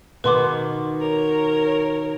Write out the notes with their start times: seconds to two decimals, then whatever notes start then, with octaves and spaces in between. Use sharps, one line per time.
0.24 B2 D#3 B3 B4 C6 D6
1.00 A#4 C#5